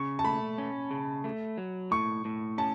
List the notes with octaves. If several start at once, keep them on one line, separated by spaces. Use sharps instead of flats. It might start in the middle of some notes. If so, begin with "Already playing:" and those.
Already playing: C#3 C#6
A5
A3 B5
C#4
C#3
A3
F#3
A2 C#6
A2
C#4 A5